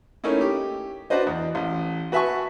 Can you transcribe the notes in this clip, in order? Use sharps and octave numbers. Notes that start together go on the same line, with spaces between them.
A3 A#3 C#4 D#4 E4
G4
D4 F#4 B4 C5 D#5
E2
A1
F#4 B4 E5 G#5 A5 C#6